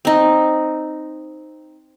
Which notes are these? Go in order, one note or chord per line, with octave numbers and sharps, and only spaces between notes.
C4 D#4